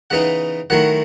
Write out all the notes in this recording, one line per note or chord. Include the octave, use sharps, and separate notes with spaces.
C#3 E3 B3 D#4 F#5
D#3 F#3 A3 E4 F#5